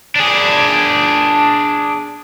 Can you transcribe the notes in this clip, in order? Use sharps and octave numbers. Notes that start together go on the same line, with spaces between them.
D4 G#4